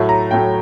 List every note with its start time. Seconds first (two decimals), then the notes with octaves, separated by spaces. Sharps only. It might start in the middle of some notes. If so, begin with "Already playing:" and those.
Already playing: A2 F#3 A3
0.09 A#5
0.31 A2 F#3 A3 G5